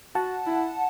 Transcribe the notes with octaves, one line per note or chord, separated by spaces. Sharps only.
F#4 F#5 A5
E4